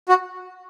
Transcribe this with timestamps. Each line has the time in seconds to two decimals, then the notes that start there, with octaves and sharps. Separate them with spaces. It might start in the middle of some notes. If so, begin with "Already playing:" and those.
0.09 F#4